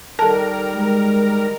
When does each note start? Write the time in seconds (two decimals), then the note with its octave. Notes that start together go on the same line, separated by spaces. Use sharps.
0.19 D#3 G3 A4 A#4 A5
0.75 G#3